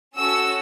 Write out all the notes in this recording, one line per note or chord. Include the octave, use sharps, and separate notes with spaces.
C#4 F#4 A4 E6